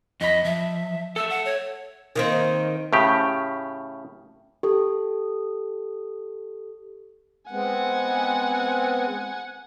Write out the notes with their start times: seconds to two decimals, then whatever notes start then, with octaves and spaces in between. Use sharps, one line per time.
0.21 F2 D#5 B5
0.45 F3 E5
1.16 A4 E5 E6
1.30 F#5
1.45 C#5
2.16 D#3 A#3 C4
2.93 A2 C#3 G4
4.63 G4 A4
7.51 G#3 B3 C4 F#5 G#5